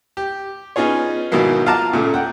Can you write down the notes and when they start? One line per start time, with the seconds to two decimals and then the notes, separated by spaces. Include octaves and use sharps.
0.17 G4
0.76 B3 C#4 D#4 F4 G#4 C#5
1.32 G#2 B2 D#3 F#3 A#3 E4
1.66 F4 F5 F#5 A5 A#5 D6
1.93 A#2 C#3 A3
2.14 F#5 G5